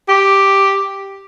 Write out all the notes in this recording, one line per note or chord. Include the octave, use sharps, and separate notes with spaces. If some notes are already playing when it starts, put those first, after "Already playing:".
G4